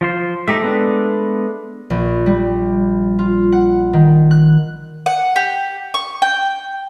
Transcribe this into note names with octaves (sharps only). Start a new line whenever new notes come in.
F3 F4 C5
A3 D#4 G4 E5
G#3 B3 D4
A#1
G3
F4
F#5
D#3
F#6
F#5
G4
C#6
G5